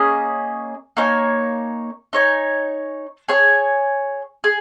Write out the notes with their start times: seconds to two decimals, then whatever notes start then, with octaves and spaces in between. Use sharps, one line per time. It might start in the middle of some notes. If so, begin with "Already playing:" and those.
Already playing: A#3 C#4 G#4 D#5
0.97 A#3 D#4 C#5 G#5
2.13 D#4 C#5 G#5
3.28 G#4 C#5 G#5
4.44 G#4